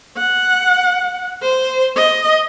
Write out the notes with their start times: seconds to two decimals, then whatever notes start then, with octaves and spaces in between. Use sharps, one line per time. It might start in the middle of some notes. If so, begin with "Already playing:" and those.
0.17 F#5
1.42 C5
1.96 D#5